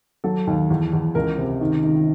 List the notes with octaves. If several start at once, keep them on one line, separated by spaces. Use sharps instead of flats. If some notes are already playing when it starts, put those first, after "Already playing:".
F#3 A4
D#2
E2
E2
C#2 A#4
C3
D#3
D#3